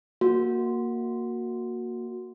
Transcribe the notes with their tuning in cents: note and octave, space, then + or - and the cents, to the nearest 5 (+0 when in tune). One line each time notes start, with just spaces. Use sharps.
A#3 +0 F#4 -15